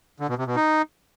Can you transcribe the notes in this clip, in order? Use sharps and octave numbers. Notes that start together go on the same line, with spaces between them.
D3
B2
C3
B2
D#4